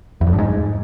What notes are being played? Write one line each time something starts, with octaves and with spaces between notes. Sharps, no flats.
E2
F2
G2
G#2